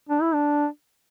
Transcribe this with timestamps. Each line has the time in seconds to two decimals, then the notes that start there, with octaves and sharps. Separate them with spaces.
0.09 D4
0.22 E4
0.34 D4